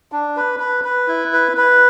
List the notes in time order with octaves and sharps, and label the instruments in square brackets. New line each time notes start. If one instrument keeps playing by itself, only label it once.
[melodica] D4
B4
B4
B4
E4
B4
B4